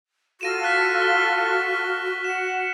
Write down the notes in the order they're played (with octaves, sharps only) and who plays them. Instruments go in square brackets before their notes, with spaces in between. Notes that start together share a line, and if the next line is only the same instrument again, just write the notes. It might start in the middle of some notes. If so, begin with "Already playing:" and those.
[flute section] F4 A4 [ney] F#4 [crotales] A#6 D#7 E7
[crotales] F6 F#6 B6
G7
[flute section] F#5 [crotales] E7